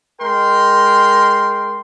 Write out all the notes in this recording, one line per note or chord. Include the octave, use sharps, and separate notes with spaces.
G#3 A#4 G5 C6